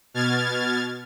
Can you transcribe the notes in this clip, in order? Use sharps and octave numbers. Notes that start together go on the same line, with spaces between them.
B2 F6 G#6 A6